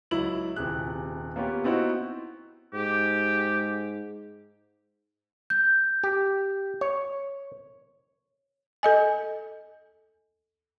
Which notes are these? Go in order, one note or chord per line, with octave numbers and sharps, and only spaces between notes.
C#2 F#3 E4 F#7
D#1 C3 G#4 F#6
A#3 B3 C#4 F4 G4
B3 C4 D#4 E4 F#4 B4
G#2 G4
G6
G4
C#5
A4 D#5 G#5